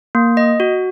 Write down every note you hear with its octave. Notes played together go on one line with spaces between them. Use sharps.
A#3
D#5
F#4